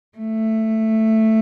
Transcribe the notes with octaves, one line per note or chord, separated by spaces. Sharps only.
A3